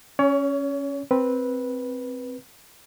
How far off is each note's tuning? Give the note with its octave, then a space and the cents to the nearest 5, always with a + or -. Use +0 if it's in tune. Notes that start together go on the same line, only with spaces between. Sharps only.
C#4 +0 C#5 +30
C4 +0 B4 -10